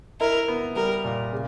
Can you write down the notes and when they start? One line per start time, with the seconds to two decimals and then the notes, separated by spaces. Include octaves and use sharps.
0.20 E4 A#4
0.48 B3
0.76 G3 A#4
1.04 A#2
1.32 C#3